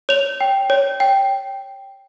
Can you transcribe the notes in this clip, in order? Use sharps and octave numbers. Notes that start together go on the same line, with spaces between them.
C#5 F7
G5
C#5
G5